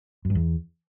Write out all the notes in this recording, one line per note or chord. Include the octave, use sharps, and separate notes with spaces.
F#2
G2
E2